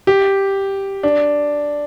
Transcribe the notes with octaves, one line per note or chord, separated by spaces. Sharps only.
G4
D4